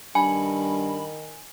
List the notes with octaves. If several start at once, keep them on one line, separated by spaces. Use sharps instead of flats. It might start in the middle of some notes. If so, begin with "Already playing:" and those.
G2 D#3 G#5 B5